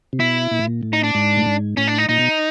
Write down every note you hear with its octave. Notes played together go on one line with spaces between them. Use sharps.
C3
B2 E4
A#2
A2
A#2
A2
D#4
D4
G#2
A2
G#2
A2 C#4
D4
D#4
A#2 D#4
B2